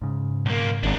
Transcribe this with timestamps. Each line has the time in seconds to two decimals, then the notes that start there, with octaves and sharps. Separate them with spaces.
0.02 G#2 C#3
0.46 B1 A#3
0.83 G#1 D4 D#4